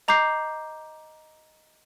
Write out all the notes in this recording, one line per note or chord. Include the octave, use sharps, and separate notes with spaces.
D#5 A#5 D6 G6 C7